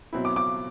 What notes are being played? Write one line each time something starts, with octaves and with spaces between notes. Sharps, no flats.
B2 F#3 C4 E4
D6
D6